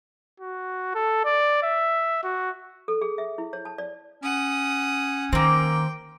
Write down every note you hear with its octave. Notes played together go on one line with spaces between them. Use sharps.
F#4
A4
D5
E5
F#4
A4
G#4
E5
E4
C#5
A5
D5
C#4 F#5 D#6
D#3 A#3 C4 G5